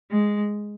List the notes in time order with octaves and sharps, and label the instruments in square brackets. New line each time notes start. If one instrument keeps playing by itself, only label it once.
[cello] G#3